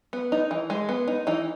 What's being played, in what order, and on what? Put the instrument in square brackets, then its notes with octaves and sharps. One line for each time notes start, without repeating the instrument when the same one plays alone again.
[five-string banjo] B3
D#4
E3
G#3
B3
D#4
E3 D#4